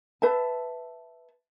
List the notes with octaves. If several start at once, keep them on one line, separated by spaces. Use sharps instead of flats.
B4 E5 A5